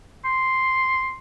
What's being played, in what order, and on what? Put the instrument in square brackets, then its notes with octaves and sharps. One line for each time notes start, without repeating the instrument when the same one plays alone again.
[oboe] C6